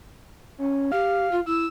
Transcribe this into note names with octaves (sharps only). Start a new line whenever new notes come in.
C#4
G4 F5
F4
E4 E6